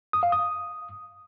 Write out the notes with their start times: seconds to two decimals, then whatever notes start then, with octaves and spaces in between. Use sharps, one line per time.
0.13 D#6
0.23 F5
0.32 D#6